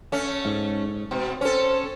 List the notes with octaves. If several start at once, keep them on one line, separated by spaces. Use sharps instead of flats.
A3 C#4
G#2
B2 C4
C#4 A4 C5